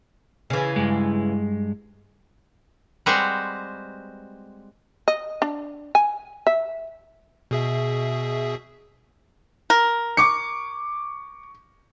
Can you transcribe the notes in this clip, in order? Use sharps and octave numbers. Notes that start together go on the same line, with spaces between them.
C#3 E3
G2 G#3
G3 G#3 C4 F#4 B4 C5
D#5
D4
G#5
E5
B2 G#4 E5
A#4
C#6 D6 C#7